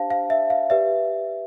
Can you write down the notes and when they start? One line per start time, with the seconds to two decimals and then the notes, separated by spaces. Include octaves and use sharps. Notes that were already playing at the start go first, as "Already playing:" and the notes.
Already playing: D4 G4 C5 F5 A5
0.10 F5
0.30 E5
0.50 F5
0.70 G4 B4 D5 E5